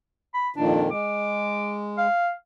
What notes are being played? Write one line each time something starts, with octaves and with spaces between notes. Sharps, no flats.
B5
F2 A#2 D#3 D4
G#3 D6
F5